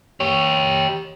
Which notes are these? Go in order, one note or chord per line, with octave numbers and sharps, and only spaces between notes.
G4 C#5